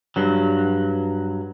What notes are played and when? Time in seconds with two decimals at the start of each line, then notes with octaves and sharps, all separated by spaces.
0.16 G2 F#3